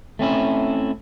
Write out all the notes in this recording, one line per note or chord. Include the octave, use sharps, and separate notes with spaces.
A3 C4 C#4 E4